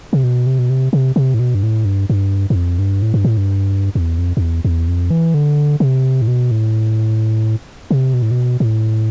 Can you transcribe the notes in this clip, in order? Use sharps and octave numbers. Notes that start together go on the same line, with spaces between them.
C3
B2
C3
B2
C3
C3
C3
A2
B2
G2
A2
G2
G2
G2
F2
G2
A2
G2
A2
G2
E2
F2
F2
E2
E2
F2
E3
D3
C3
A2
B2
A2
C3
B2
A2
B2
A2